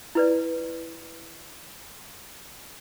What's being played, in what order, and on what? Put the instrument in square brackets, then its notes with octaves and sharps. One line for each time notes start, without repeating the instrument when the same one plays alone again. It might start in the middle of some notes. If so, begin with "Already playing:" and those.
[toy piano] E4 B4 D5